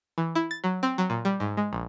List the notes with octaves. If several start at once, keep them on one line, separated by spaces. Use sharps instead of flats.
E3
E4
A6
F#3
C4
F#3
A#2
G3
G#2
G#3
A#1